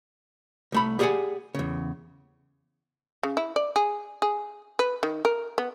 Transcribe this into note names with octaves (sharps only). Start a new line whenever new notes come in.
C2 A3 B5
G4 G#4 D5 D#5 F#5 G#5
E2 C#3
C#3
E4
D5
G#4
G#4
B4
D#3
A#4
B3